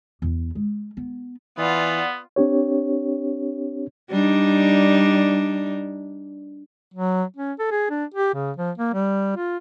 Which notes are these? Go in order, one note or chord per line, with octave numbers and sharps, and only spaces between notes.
E2
G#3
B3
E3 B3 F4 D5 F#5
C4 D4 G4 C#5
G3 D4 D#4
F#3
C#4
A4
G#4
D4
G4
C#3
F3
A#3
G3
F4